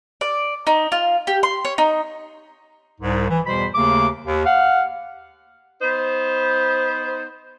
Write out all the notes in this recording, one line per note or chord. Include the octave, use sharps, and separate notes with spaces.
D5
D#4
F4
G4
C6
C#5
D#4
C2 G#2
E3
E2 B2 G3 C5 B5
D#2 C#3 A3 A#3 D6
D#2
F5 F#5
B3 D#4 C5